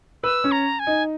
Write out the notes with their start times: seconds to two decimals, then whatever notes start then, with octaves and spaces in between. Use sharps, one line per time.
0.23 B4 E6
0.44 C#4
0.52 A#5
0.79 G#5
0.87 D#4